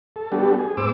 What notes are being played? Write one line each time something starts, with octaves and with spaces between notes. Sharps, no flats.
A4
G3 B3 D4 F#4 G4 A4
G#4
G#2 B3 C5 D6 E6